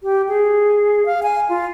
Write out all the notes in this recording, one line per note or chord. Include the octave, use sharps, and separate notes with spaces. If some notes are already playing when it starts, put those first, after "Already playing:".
G4
G#4
F5
G#5
F4